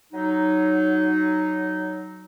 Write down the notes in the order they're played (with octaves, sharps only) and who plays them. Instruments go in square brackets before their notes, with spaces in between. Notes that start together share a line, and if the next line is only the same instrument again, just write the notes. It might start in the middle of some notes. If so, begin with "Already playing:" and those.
[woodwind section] F#3 D#4